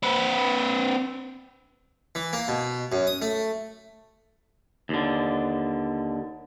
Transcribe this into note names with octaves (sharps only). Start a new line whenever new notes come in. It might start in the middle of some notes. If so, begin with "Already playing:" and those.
C4 B4
E3
A#3
B2
F#2
D#6
A3
D#2 D3